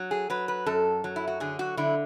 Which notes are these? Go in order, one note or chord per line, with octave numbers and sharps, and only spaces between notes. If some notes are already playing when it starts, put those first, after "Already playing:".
Already playing: F#3
G#4
F#3 B4
B4
F#2 A4
F#3
E4
F#4
D3 G#4
F#4
D3 E4